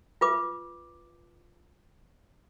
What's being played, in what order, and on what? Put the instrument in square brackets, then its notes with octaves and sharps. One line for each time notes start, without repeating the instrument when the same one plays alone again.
[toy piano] F4 B4 D6